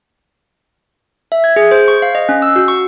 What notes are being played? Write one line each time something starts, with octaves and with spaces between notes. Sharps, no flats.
E5
G#6
G#4
C5
C#6
F5
D#5
C#4
E6
F#4
C#6